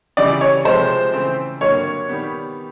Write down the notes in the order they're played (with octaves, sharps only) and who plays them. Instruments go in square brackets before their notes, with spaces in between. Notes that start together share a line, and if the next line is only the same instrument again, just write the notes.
[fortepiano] C#3 E3 G3 [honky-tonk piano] D5
[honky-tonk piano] C#5
[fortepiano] C3 F3 G#3 [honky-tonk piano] C5
[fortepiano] C#3 E3 A3 C4
[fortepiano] G2 D3 F#3 A#3 [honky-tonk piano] C#5
[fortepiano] D#3 G3 B3